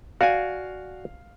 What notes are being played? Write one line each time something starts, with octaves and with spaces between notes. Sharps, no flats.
F#4 D5 F5 G#5